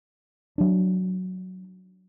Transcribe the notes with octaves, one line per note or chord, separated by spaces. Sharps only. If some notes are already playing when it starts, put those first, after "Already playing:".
F#3 D4